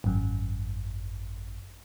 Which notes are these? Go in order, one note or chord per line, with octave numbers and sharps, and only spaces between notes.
G#1 F#2